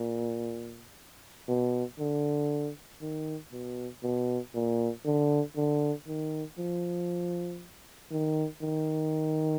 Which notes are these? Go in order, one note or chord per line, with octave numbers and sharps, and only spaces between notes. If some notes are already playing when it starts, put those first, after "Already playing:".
Already playing: A#2
B2
D3
D#3
B2
B2
A#2
D3
D3
D#3
F3
D#3
D#3